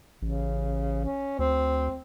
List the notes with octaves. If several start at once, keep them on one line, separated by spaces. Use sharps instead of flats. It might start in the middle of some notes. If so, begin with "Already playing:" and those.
A1 C#3
C#4
D2 C4